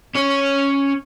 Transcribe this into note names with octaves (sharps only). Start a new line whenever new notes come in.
C#4 C#5